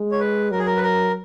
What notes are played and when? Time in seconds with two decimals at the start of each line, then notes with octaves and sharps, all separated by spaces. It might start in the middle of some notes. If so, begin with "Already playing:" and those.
Already playing: G#3
0.12 C#5
0.20 B4
0.51 F#3 A#4
0.59 G#4
0.66 A#4
0.76 B4
0.83 A#4